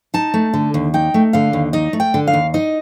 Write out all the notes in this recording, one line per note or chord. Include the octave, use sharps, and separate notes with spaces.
D#4 A5
A3
D3
D#2
D#4 G5
A3
D3 F5
D#2
D#4 D#5
A3
G5
D3
F5
D#2
D#4 D#5